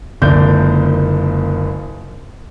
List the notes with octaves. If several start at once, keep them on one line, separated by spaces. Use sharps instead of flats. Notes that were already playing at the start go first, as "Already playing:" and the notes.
F#1 C#2 D3 A#3 G6